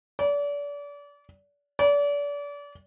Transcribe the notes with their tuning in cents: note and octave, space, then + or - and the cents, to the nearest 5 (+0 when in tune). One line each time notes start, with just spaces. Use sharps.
D5 -35
D5 -35